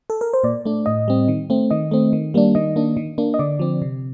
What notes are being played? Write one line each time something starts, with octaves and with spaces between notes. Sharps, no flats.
A4
A#4
C5
A#2 D5
A3 D4
A2 D#5
G3 C4
D#3
A3 C4
D#3 D#5
A3 C4
D#3
G3 A#3 D4
D#3 D#5
A#3 D4
D#3
A#3 D4
D#5
D3 D5
F3 C4
C3